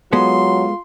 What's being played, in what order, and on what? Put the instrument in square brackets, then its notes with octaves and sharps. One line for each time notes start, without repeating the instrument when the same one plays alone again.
[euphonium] F#3 [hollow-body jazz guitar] G#3 B3 A4 [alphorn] F4 [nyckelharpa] C6